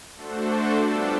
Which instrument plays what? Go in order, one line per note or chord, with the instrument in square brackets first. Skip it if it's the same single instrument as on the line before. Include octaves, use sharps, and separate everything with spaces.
[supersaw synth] A3 D4 F#4 A4 C5
G3 B3 D4 F4 A4